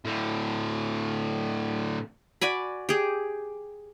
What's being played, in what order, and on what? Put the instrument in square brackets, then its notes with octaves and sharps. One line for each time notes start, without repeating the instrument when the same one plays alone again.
[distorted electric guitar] A2 D3
[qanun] F#4 D5 G#5 B5
G4 G#4